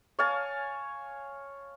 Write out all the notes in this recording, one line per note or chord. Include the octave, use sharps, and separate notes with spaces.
C#5 F5 G#5 A5